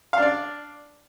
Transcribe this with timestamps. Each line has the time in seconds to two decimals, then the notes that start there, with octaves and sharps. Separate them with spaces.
0.13 F5
0.18 D4
0.22 D5